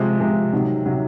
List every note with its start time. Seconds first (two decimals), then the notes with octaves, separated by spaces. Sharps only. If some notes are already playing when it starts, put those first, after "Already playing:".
Already playing: C3 F3 G#3
0.20 C3 F3 G#3
0.53 C3 D#3 F#3
0.86 C3 D#3 F#3